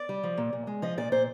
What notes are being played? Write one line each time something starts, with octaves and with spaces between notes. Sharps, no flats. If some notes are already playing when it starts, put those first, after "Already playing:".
Already playing: D5
G3
F3
A#2
A#2
G#3
F3 D#5
A#2 D5
A#2 C5